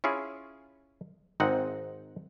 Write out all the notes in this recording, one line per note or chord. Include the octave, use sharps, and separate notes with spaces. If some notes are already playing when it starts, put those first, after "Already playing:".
C#4 E4 F4 G#4
G#1 G#2 C4 D#4 F#5